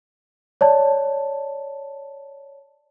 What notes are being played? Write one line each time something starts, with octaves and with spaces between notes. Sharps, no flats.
C#5 D5 A5